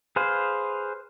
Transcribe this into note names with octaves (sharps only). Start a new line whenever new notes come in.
G#4 B4 C5 F5